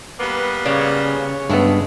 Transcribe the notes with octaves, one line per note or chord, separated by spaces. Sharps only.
G3 A#3 B3 B4
C#3 C#5 D5
C#5
G2 G#3 A3 B3